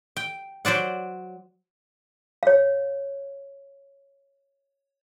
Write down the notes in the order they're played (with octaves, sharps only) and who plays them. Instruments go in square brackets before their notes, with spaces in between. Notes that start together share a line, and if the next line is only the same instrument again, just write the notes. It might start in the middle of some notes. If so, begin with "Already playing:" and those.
[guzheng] G5
F#3 C5 D5 F#5
[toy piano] C#5 F5